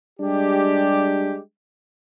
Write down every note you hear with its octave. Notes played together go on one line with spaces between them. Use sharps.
G3 G#3 D4 G4